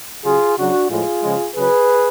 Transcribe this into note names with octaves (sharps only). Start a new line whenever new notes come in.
C#3 F#3 F4 G#4
C#3 F#3 D4 F#4
A2 F3 G#3 F4 G#4
C#3 F3 G#3
C#3 F#3 G#4 B4